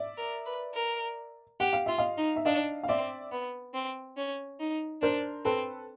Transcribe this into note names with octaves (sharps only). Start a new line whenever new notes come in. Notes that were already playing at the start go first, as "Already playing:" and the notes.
Already playing: D5 E5
A#4
B4
A#4
G4 F#5
F5
F4 E5
D#5 F5
D#4
E5
D4 D#5 F5
F5
C4 D5 E5
B3
C4
C#4
D#4
D4 A#4 C5
C4 A4 B4